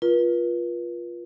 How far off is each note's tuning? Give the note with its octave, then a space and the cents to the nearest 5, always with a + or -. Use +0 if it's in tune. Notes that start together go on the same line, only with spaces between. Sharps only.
F4 +0 B4 -40